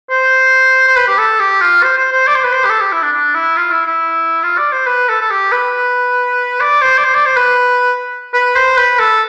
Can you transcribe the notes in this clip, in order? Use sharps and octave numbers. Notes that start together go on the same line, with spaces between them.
C5
C5
B4
G4
A4
G4
F4
C5
C5
C5
D5
C5
B4
C5
G4
A4
G4
E4
D4
D4
E4
F4
E4
E4
F4
D5
C5
B4
A4
A4
G4
B4
D5
C5
D5
C5
D5
C5
B4
B4
C5
B4
A4